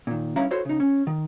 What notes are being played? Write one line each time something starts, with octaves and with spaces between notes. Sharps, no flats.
A#2 D#3
G2 C#4 E4 E5 F5 A#5
E4 F#4 A4 C5 C#5 C6
C#3 D#4
C#4
D#3